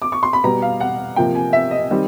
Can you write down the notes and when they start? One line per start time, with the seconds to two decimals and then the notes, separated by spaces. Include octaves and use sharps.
0.02 D6
0.12 C#6
0.23 C6
0.33 B5
0.44 B2 G3 B3 A#5
0.62 F5
0.80 F#5
1.16 C3 F3 A#3 G5
1.35 G#5
1.53 E5
1.71 D#5
1.91 D#3 G3 C4